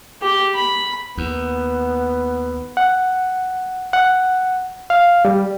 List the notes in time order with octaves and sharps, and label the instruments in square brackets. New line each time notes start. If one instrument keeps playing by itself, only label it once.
[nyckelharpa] G4
B5
[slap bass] D#2 [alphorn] B3
[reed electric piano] F#5
F#5
F5
G3